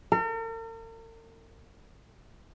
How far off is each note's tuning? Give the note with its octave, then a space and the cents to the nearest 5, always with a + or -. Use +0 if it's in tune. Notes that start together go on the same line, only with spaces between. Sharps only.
A#4 -45